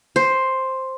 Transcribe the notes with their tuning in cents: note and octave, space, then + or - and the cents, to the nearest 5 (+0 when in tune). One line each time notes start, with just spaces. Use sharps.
C5 +5